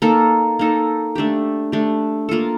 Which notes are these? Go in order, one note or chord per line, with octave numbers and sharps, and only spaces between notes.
A#3 D#4 A4
A#3 D#4 A4
A3 D4 G4
A3 D4 G4
A#3 F4 A4